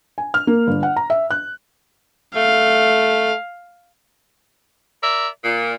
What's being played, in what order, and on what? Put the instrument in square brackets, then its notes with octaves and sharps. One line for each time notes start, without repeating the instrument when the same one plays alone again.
[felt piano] G#5
F6
A#3
G1
F#5
A#5
E5
F#6
[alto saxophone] A3 [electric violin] F5
[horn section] A#4 D5 E5
A#2